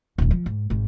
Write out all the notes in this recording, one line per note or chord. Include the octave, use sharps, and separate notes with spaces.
D#1 D2
F3
G#2
G#1 G#2